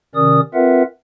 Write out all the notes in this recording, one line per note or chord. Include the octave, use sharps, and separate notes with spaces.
C3 D#3 C#4 A#4 D5 D#6
C4 F4 A#4 B4 E5 F#5